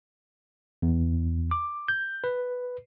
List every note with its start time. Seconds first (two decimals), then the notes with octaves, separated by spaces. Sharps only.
0.82 E2
1.51 D6
1.88 G6
2.24 B4